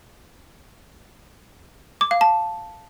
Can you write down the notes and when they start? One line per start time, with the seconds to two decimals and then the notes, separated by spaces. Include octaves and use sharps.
2.01 D6
2.11 F5
2.21 A5